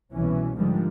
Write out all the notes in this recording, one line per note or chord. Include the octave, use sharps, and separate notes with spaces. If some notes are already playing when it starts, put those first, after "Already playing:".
C2 B2 E3 C#4
G#2 D3 D#3 F3 G3 G#3